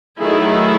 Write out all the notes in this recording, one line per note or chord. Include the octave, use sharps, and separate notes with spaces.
D#3 F#3 A3 E4 G#4